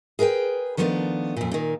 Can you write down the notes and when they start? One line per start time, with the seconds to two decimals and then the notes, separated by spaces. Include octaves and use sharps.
0.19 G#4 A#4 B4 E5 G5
0.77 D#3 F3 G3 A3 B3 D4
1.37 F2 A#2
1.52 A#2 D#3